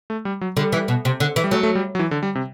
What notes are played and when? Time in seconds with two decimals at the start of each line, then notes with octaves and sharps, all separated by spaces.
0.10 A3
0.25 G3
0.41 F#3
0.57 D3 G3
0.72 E3
0.88 B2
1.05 C3
1.20 D3
1.36 E3
1.44 G3
1.51 F#3 A3
1.63 A3
1.75 G3
1.95 F#3
1.99 E3
2.11 D3
2.23 G3
2.35 C3